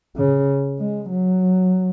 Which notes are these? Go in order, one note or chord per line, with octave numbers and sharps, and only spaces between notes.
C#3
G#3
F#3